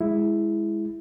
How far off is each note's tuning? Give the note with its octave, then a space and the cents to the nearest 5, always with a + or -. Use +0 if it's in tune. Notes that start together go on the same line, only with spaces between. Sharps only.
G#3 +0 E4 +0